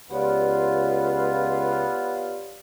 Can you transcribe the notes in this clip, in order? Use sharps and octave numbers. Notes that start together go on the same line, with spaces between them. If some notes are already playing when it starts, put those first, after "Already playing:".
C#2 B3 F4 G4 C#5 D5